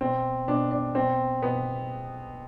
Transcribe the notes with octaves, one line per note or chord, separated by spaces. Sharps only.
B2 C4
B2 D4
D4
B2 C4
B2 B3